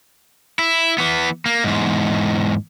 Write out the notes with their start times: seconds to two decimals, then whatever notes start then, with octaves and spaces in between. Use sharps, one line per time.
0.59 E4
0.98 E3 B3
1.46 A#3
1.64 E2 G#2